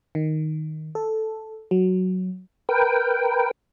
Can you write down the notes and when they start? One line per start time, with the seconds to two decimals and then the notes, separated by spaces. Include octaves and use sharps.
0.15 D#3
0.95 A4
1.71 F#3
2.69 A#4 B4 G5